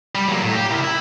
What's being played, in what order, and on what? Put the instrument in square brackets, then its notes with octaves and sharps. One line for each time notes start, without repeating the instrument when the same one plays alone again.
[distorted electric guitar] G3
F#3 A#3
A2
G4
E4 A#4
E4